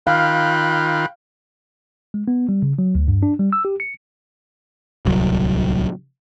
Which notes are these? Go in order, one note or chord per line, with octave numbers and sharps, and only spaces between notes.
D#3 F4 F5 G5 B5 F#6
G#3
B3
G3
C#3
F#3
D2
G2
D4
G3
E6
G4
C#7
D1 C2 F#3